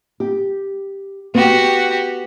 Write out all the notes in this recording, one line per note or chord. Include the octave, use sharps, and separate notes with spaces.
G4
B3 F#4 G4